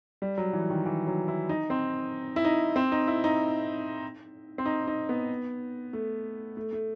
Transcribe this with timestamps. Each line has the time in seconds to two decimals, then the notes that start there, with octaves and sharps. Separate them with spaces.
0.22 G3
0.38 F#3
0.53 E3
0.70 D#3
0.86 E3
1.07 F#3
1.28 E4
1.49 D#4
1.70 C4
2.36 E4
2.45 D#4
2.76 C4
2.92 D#4
3.07 E4
3.24 D#4
4.58 C4
4.66 D#4
4.88 D#4
5.09 B3
5.93 A3
6.57 A3
6.73 A3